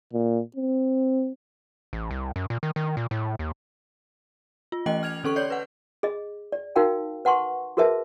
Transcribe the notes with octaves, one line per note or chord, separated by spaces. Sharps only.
A#2
C4
A1
C2
F#2
A#2
D#3
D#3
A#2
A2
D#2
F4
E3 A3 C#4 D#5 G5 F#7
F6 G#6 F7
D3 C#4 A4 C#6 F#7
C#5 D5 G6
B4 F#5
G#4 D#5
D5
D#4 F#4 A#4 F5 G5 A5
B4 F#5 A5 C6 C#6
F#4 G#4 A#4 B4 E5 A5